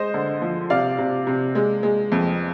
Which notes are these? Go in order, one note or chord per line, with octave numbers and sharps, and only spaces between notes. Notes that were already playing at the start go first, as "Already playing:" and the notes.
Already playing: G#3 C5 D#5
D3
F3
C3 D5 F5
C3
C3
G#3
G#3
F2